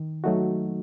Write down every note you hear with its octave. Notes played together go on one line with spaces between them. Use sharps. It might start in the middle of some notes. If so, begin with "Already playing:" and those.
Already playing: D#3
F#3 A3 D#4 F#4